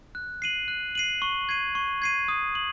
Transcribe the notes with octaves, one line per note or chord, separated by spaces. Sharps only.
F#6
C7 D#7 F#7
F#6
C7 D#7 F#7
C#6
G#6 C7 D#7
C#6
G#6 C7 D#7
D#6
F#7